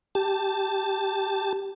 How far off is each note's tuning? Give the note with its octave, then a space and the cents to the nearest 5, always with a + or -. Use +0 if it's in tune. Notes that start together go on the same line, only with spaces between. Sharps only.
G4 +0 A5 +0